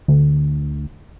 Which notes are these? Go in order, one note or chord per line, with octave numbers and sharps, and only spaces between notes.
D2